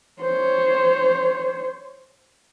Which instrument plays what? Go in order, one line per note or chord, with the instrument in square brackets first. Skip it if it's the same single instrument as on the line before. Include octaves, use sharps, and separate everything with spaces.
[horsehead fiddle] C5 C#5